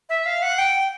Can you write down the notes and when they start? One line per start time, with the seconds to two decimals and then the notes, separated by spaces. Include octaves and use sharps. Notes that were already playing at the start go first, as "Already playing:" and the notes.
0.09 E5
0.26 F5
0.42 F#5
0.58 G5